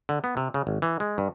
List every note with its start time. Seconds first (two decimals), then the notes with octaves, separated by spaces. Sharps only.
0.09 D3
0.24 B3
0.37 C3
0.54 C#3
0.67 G#1
0.82 E3
1.00 G#3
1.18 G2